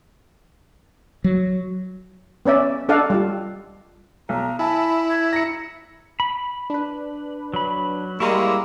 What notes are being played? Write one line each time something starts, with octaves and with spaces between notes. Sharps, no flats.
F#3
B3 C#4 D5 E5
D4 A4 D5 D#5 F5 F#5
G3 F4
B1 A#5
E4 G#5 A5 B5
G#6
A#5 A#6 C#7
B5
D4 B4
F#3 B5
G3 G#3 A#3 E4 A#5 C6 C#6